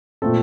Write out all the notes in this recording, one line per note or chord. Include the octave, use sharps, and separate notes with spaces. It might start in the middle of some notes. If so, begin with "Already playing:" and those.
A#2 A3 C4 A4